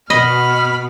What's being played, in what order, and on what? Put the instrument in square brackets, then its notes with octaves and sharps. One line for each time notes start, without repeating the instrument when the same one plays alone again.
[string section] B2 [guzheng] D#5 [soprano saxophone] B5 [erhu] F6